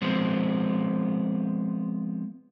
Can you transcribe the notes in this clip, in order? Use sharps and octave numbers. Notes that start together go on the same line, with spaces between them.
F3 G#3 B3 C4